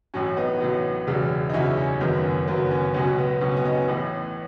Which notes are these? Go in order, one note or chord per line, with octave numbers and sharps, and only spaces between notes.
A1 A2 F#3 C#4
B3 D#4
A1 A2 F#3
E1 E2 C#3 F#3
D#4
E1 E2 C#3 F#3 C#4 E4
C#4
F#1 F#2 D#3 F#3 B3
C#4
F#1 F#2 D#3 F#3 B3
C#4
C#2 B2 F#3 C#4
B3
C#2 B2 F#3 C#4
C#4
B3
D#4
C#4
A1 A2 E3 B3